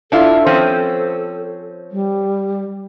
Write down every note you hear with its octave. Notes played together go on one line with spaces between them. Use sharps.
D4 E4 F4 A4
F3 C4 C#4
G3